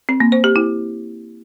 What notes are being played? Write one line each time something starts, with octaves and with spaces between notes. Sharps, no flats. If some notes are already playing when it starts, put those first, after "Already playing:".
C4
A#3
C5
G4
E4